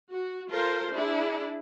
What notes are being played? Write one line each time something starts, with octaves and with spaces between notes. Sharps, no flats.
F#4
F4 A4 A#4 C5
D4 E4 G#4